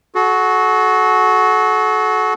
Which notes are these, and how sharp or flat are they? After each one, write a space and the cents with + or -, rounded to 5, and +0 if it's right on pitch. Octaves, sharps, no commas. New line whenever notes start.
F#4 +0 A4 -40